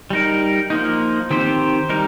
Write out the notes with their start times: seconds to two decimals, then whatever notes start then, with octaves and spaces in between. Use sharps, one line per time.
0.10 G3 D#4 A#4
0.70 F3 A#3 D#4
1.30 D#3 C4 G4 C5
1.90 G3 D#4 A#4